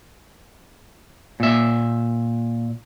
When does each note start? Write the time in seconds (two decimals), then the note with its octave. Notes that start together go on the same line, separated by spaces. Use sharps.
1.40 A#2 E5